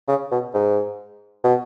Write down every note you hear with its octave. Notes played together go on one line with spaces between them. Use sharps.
C#3
B2
G#2
B2